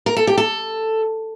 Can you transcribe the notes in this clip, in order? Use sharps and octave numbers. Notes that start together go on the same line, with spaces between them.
A#4
A4
G4
A4